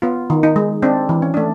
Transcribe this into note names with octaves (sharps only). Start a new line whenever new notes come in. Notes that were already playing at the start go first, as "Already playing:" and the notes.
B3 F4
D#3
D#4
G#3
C4 D4
E3
C#4
A3 D4